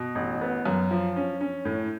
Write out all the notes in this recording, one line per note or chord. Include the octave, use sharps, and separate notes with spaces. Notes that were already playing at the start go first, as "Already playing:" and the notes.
Already playing: B2
A1
B3
F#2
F3
C#4
C#4
A2